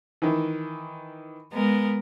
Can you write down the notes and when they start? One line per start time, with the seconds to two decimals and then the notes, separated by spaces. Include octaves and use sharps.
0.22 D#3 E3
1.52 G#3 B3 A#4